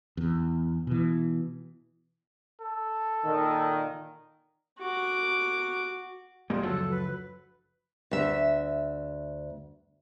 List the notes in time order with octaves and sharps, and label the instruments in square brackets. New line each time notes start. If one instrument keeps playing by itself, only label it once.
[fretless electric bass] E2
B2 E3
[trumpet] A4
[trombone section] A#2 D#3
[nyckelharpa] F#4 D6
[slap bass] D#1 G#3 A#3 [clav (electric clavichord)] G3 [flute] F4
[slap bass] F#1 D2 F3 [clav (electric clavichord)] F#3 [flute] A4
[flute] B4
[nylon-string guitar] D2 E5